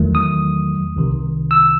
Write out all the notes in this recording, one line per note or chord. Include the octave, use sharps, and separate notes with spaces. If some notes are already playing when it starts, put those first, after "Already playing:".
Already playing: E2 D#3 F#3 A3
D#6
C2 C3 D#3
E6